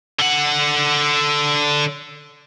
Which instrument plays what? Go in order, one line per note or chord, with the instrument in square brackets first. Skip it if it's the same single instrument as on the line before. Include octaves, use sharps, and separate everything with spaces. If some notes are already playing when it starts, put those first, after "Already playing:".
[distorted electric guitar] D3 F#5